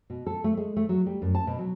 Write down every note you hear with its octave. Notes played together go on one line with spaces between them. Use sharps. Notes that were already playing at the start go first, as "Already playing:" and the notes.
B2
A4
A3
G#3
A3
F#3
G3
F#2
A5
B2
F#3